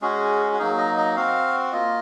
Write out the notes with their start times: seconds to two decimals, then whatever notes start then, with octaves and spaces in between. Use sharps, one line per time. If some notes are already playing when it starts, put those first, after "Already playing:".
0.02 G#3 C#4 F#4 G#4
0.53 F#4
0.59 F#3 A#3 D#4 G#4
0.78 D#5
0.97 D#5
1.16 C4 F#4 F5
1.72 A#3 F4 D#5